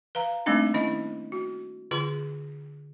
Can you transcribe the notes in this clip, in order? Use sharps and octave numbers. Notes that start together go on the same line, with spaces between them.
B4 F5 A#5
G3 A3 A#3 C4 D4 D#4
D#3 C#4 E4 D#5
F#4
D3 F4 G#4 C6